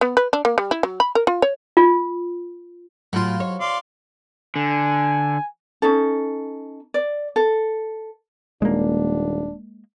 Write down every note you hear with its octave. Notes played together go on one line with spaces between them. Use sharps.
B3
B4
D4
A#3
G3
E4
F#3
B5
A#4
F4
C#5
F4
A2 F#3 F4 C6
C#5
D5 F5 C6
D3 G#5
C#4 D#4 A4
D5
A4
D#1 G#3 A#3 D4